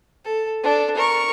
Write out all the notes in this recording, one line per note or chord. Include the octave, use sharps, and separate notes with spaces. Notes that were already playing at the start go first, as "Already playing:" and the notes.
A4
D4 A4
A#4 C#6